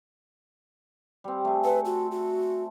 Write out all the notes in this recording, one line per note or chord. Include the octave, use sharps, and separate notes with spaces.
G3 C4
A3 G#4
A4 B4
F#4
F#4